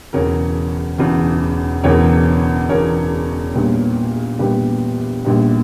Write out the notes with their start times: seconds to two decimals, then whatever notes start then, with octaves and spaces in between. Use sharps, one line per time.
0.13 E1 E2 C#3 A#4 C#5
0.98 E1 E2 C#3
1.83 E1 E2 C#3 A#4 C#5
2.69 E1 E2 C#3 A#4 C#5
3.54 A#1 A#2 G3 B3
4.39 A#1 A#2 G3 B3 G4 B4
5.25 A#1 A#2 G3 B3